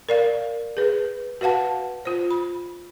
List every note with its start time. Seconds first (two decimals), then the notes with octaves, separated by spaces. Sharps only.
0.09 A#4 D5 F5
0.77 G#4 B4
1.41 F#4 B4 F5 F#5 A5
2.05 F4 C5
2.31 B5